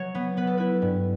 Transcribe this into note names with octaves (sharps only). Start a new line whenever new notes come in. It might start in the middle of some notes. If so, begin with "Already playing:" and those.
Already playing: F#3 C#5
B3
B3 B4
A4
E4 B4
G2